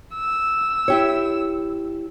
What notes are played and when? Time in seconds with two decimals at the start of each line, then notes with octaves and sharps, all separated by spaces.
0.14 E6
0.88 E4 G4 C#5